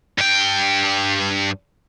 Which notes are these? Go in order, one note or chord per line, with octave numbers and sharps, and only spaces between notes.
G2 G5